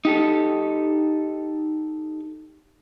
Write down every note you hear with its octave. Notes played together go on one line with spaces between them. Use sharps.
D#4 G4 A4